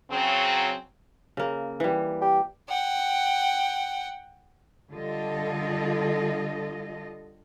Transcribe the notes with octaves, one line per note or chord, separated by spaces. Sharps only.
C#3 F#3 C4
C#3 A#3
E3 G3
G4
F#5 G5
D3 G3 F4 A4 D#5